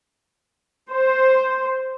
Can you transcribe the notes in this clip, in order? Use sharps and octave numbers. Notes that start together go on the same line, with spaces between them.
C5